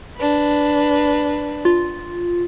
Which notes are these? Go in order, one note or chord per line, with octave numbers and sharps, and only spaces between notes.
D4 B4
F4